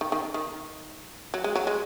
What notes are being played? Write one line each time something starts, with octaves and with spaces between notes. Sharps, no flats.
D#3
D#3
D#3
F#3
G#3
F#3
G#3